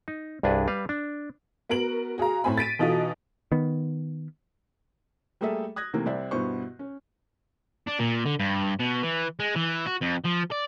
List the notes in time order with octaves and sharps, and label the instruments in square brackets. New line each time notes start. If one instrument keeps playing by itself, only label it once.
[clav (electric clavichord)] D#4
C2 G2 D4 G#4 B4
G3 B4 F5
D4
[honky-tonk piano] B3 F#4 A#4 D7 F#7
F#4 G#4 F5 A#5
A2 A3 C4 G#5 B5
A6 B6 D7 D#7
B2 E3 D#4 F4 F#4 A4
[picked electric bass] D#3 B3
[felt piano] G3 A3 A#3 G#4 A4 E5
D#6 F#6 G#6 A#6
C3 E3 A3 A#3
C2 C4 D5 E5
G2 B2 B3 E4 C5 C#6
C#4
[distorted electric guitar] D4
A#2
D3
G2
B2
E3
G#3
E3
F#4
F2
F3
D5